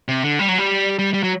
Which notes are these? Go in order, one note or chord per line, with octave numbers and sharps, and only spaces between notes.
C3
D3
G3
F#3
G3
G3
G3
F#3